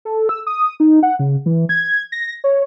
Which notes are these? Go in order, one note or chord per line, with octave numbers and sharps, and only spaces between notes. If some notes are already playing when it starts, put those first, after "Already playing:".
A4
E6
D#6
D#4
F#5
C#3
E3
G#6
A#6
C#5